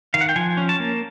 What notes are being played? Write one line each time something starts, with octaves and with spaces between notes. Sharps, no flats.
D#3 F5
F#5
G5
F3 G#5
C#4
A5
A#3